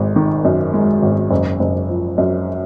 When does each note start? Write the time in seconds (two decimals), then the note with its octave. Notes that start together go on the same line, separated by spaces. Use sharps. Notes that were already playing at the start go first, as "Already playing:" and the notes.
Already playing: G#1 G#3
0.16 D#3
0.45 F#2
0.74 G#3
1.03 G#1
1.31 F#1
1.60 F#1
1.89 F3
2.18 F#2